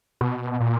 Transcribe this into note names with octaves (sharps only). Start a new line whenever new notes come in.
B2
A#2